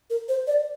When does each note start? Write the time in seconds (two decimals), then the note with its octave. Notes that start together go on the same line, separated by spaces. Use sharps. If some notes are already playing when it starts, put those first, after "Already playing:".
0.10 A#4
0.29 C5
0.47 D5